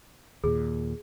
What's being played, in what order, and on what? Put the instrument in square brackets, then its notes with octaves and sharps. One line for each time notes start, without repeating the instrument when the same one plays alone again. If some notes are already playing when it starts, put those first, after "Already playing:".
[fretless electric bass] D#2 A#2 [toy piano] G#4